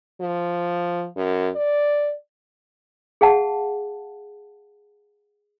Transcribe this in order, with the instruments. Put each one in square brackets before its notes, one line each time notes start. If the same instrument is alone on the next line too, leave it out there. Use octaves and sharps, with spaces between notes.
[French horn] F3
F#2
D5
[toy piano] G#4 F5 F#5 A5